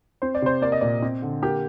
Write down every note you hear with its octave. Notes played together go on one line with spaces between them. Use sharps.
C4 C5
D5
C3 C5
A#3 D5
D#5
A#2 D5
C4
D3
A#3 G4